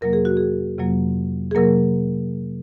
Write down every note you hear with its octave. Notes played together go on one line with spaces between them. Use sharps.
F2 C3 F#3 A#3 A#4
G#4
F#4
G#4
F2 C3 F#3 A#3
G#4
C3 F#3 A#3 A#4